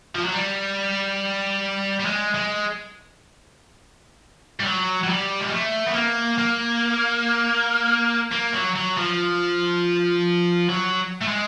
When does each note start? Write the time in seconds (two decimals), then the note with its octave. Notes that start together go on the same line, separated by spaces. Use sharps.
0.15 F3
0.24 F#3
0.33 G3
2.00 G3
2.06 G#3
2.34 G#3
4.60 G3
4.64 F#3
5.03 F#3
5.08 G3
5.40 G#3
5.51 A3
5.86 B3
5.94 A#3
6.38 A#3
8.32 A#3
8.53 F#3
8.75 F#3
8.97 F3
10.69 F#3
11.21 A3
11.28 G#3